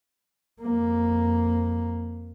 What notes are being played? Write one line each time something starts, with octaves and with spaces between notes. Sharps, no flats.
F2 A#3